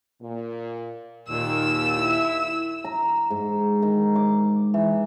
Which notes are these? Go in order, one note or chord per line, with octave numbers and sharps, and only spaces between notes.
A#2
D#2 A#2 D#3 E6
E4
A#5
G#2
D#3
D6
E3